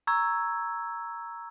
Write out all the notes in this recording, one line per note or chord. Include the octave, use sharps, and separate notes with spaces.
A#5 C#6 E6 G#6